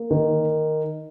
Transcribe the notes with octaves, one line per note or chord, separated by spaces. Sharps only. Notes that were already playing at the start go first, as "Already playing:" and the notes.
Already playing: A#3
D#3